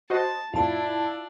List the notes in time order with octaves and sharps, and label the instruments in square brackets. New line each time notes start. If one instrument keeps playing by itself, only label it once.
[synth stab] F#4 C5 D#5 [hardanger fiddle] A5
[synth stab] F2 A2 [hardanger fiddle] D4 [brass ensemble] E4 [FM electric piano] F4 A5